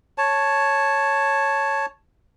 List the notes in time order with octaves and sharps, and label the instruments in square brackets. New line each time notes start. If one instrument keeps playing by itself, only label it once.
[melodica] C#5 A5